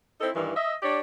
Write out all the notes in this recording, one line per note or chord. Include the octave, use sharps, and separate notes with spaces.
C4 D#4 E4 A4
G2 D#3 E3
D#5 E5
D4 G4 C#5 D5